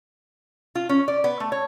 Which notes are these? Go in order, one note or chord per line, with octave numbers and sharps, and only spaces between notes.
F4
C#4
D5
B3
A3
C#5